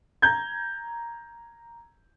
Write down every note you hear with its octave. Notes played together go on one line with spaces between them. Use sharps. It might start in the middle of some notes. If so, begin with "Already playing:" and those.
A#5 G6 G#6